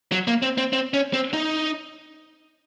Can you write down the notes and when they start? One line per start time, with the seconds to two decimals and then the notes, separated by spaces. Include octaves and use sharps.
0.12 F#3
0.27 A#3
0.42 C4
0.58 C4
0.73 C4
0.94 C#4
1.14 C4
1.33 D#4